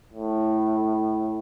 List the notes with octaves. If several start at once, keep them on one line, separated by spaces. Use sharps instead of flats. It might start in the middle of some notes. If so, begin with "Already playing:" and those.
A2